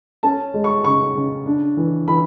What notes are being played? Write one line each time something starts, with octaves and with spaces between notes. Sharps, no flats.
C#4 A5
G#3
C#6
C#3 C#6
C#3
D4
E3
E3 B5